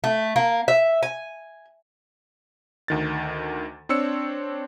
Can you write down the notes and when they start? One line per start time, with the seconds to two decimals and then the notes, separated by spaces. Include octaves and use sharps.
0.04 A3
0.36 A#3
0.68 E5
1.03 G#5
2.88 D2 D#3 A6
3.89 C4 D4 C#5 E6 C#7